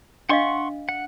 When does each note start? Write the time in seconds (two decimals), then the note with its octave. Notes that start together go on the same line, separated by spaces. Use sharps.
0.29 D4 D#5 F5 F#5 C6 C#6
0.89 F#5